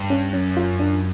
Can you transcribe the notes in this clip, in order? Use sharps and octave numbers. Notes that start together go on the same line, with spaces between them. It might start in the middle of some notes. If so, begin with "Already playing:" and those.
Already playing: G2
C#4
F#2 C#4
F4
D4